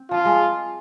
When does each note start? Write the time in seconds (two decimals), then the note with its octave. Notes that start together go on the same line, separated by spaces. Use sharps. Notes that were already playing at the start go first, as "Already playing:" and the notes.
Already playing: C4
0.11 F3 F4
0.25 G#3